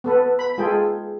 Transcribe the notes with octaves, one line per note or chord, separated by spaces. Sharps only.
B3 A4 B4
B5
G#3 F4 G#4 A4 G5